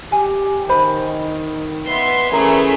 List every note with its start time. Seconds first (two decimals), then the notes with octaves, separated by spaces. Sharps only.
0.12 G4 G#5
0.69 D#3 C5 B5
1.87 B3 E5 C6
2.33 E3 A3 C#4 G#4 A#4 A#5